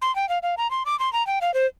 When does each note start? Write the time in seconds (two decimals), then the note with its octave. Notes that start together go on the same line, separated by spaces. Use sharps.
0.02 C6
0.16 G5
0.29 F5
0.43 F5
0.58 A#5
0.71 C6
0.86 D6
0.99 C6
1.13 A#5
1.27 G5
1.41 F5
1.54 C5